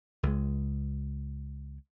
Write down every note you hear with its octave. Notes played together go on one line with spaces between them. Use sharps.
C#2 G#3